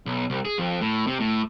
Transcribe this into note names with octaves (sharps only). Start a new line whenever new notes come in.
B1
C2
G#4
F2
A2
C3
A2